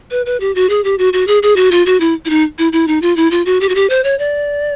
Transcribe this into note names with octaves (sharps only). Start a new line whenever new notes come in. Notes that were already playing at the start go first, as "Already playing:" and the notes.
B4
B4
G4
F#4
G#4
G4
F#4
F#4
G#4
G#4
F#4
F4
F#4
E4
E4
D#4
E4
E4
D#4
F4
E4
F4
F#4
G4
F#4
G4
C5
C#5
D5